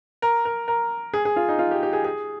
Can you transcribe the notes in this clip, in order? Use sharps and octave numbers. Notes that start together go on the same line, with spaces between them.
A#4
A#4
A#4
G#4
G#4
F4
D#4
F4
G4
G4
G#4
G#4